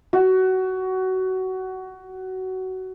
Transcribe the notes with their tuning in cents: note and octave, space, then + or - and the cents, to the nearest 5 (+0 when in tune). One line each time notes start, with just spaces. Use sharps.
F#4 +20